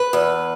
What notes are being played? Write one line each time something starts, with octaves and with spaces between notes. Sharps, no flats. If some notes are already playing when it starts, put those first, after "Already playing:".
Already playing: B4
E2